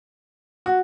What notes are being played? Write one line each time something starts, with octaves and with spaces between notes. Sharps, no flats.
F#4